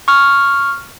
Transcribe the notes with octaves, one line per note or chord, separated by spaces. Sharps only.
C#6 F6